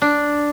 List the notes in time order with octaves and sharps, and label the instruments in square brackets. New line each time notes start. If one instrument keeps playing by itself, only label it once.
[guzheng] D4